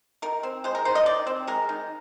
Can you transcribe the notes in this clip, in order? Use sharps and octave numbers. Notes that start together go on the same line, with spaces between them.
D#3 A#4
C4
G#3 C5
A#4
D#3 C5
D#5
D#3 D5
C4
G#3 A#4
D#3